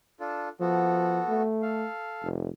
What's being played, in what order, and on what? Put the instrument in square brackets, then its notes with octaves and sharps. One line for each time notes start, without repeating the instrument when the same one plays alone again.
[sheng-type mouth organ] D4 F4 A4
[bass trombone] F3 [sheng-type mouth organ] B3 F#4 A4
[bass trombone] A3
[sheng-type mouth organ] A4 F5
[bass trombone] F1